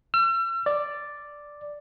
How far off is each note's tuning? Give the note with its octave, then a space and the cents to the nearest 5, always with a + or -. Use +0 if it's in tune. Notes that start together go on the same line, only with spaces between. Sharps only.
E6 +45
D5 +0